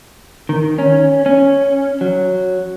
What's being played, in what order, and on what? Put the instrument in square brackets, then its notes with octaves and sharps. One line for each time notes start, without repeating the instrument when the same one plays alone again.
[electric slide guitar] D#3
C#4
C#4
F#3